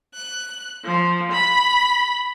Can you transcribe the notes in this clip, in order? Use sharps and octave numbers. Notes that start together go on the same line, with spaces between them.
F#6
F3
B5